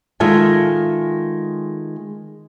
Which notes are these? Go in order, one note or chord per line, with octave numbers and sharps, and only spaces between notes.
D#3 G#3 F4 A4 E5 G#5